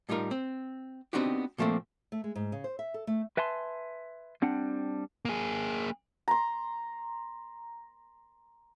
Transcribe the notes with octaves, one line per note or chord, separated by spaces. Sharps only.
A2 G3 D#4 F4 A#4
C4
B3 C4 D4 D#4 F#4 G4
A#2 F3 A3 A#3 C4
A3
G#3
G#2
C#3
C5
E5
A4
A3
B4 E5 G#5 A5 C6
G3 C4 D4 F#5
A#3 G#4
A#5 C6